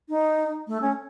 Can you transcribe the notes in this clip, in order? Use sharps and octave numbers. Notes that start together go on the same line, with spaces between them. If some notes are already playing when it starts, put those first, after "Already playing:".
D#4
A3
C#4